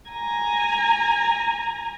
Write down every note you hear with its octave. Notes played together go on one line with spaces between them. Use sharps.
G#5 A#5